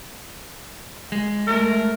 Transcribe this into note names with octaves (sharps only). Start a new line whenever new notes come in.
G#3
A3 A#4